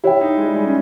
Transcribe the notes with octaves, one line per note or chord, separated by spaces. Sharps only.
E4 G4 C#5 G5
D#4
G#3
G3
G#3
C#4